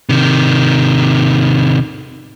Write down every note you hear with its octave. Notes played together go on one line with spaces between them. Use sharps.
C3 D#3